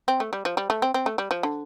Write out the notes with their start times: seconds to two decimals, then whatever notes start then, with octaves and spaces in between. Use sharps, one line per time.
0.08 C4
0.20 A3
0.33 G3
0.45 F3
0.57 G3
0.70 A3
0.82 C4
0.94 C4
1.06 A3
1.18 G3
1.31 F3
1.43 D3